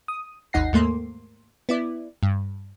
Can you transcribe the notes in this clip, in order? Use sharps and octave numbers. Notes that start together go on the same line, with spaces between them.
D#6
G#1 D#2 D#4 F#5 A#6 C7
D#2 G#2 A3 A#3 C6
B3 E4 D5
G2